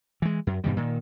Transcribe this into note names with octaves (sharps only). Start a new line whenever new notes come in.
E3 G#3
F#2
G2 B2 D#3 G3
A#2 D#3